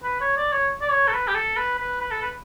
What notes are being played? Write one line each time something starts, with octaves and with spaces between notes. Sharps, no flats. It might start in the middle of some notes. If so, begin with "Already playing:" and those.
B4
C#5
D5
C#5
D5
C#5
A4
B4
G4
A4
B4
B4
B4
A4
B4